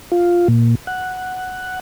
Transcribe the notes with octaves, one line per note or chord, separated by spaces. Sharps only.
F4
A#2
F#5